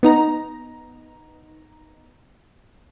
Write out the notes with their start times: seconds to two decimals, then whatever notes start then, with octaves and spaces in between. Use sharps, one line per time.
0.03 B3 D#4 A#5